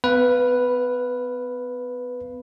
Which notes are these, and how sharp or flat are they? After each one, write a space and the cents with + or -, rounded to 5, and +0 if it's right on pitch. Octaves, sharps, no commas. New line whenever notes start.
B3 +35 B4 +0 F5 -10